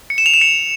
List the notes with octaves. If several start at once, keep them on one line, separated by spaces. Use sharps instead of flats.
C#7
E7
F7
E7
C#7